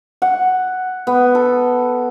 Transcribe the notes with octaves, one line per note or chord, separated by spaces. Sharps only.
F#5
B3
A4